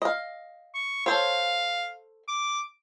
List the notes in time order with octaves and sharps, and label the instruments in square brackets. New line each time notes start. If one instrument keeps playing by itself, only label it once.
[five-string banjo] D#5 F5
[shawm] C#6
[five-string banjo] A4 C5 C#5 [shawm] F5
[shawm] D6